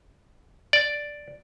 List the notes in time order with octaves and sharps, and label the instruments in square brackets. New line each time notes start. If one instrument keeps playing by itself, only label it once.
[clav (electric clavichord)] D5